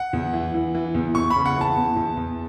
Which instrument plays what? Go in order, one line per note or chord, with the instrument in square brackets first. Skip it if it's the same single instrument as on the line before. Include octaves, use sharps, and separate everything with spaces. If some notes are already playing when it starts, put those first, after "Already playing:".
Already playing: [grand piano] F#5
E2
E3
E3
E3
E2
E2 C#6
C#3 B5
F#5
E3
A5
E2
E2
E2